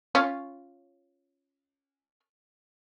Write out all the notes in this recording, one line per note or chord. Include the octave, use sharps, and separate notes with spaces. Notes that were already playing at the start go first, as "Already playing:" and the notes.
C#4 F4 C#5